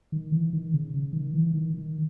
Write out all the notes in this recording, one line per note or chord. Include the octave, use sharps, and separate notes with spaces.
D#3
E3
D#3
C#3
C#3
D#3
E3
D#3
D#3